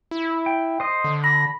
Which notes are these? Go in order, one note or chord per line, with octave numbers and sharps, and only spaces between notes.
E4
G5
C5 D#5
D3
B5 A#6